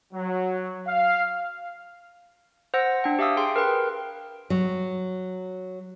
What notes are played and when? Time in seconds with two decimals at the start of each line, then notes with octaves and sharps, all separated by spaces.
0.13 F#3
0.87 F5
2.74 C5 F#5 E6 A#6
3.04 D4 G5
3.19 G4 E5 F5 D#6 E6
3.37 G#4 G5 C6
3.56 A#4 B4 G5
4.50 F#3